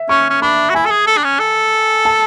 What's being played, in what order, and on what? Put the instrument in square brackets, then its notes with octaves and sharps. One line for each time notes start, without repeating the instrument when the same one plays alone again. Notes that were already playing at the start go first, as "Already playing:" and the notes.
Already playing: [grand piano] E5
[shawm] C#4 [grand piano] C#6
[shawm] C#4
[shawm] D4 [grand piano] B5
[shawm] F#4
[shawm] E4 [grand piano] G#5
[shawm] A4
G#4
A4
D4
C#4
A4
[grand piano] A5